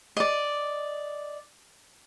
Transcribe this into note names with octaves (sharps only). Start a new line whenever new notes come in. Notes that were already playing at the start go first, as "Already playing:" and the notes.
D5 D#5